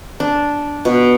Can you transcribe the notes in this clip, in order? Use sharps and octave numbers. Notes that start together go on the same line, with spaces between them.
D4
B2